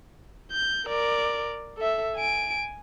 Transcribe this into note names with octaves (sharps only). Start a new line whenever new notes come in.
G6
A#4 D5
A4 E5
G#5 D7